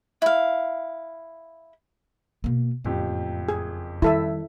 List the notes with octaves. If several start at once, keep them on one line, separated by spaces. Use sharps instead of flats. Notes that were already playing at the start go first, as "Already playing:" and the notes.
E4 F5
B2 A#3
F#1 F2 A2 G4
G#4
D#3 G3 E4 A4 E5